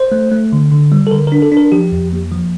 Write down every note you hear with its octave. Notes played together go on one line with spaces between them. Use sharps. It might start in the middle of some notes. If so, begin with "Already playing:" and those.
Already playing: C5
A3
A3
D3
D3
G3
A4
D3 A#4
A#4
D4
A4
D4
A#4
F3 G4
F2
A#3
F3